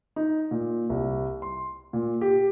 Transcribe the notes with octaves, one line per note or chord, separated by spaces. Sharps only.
D#4
A#2
C2
C6
A#2
G4